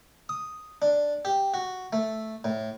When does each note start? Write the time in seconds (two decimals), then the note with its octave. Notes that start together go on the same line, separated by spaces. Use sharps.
0.29 D#6
0.82 D4
1.25 G4
1.54 F#4
1.93 A3
2.44 A2